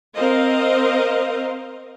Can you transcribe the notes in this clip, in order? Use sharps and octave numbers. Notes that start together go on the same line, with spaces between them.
C4 A#4 C5 D#5 F5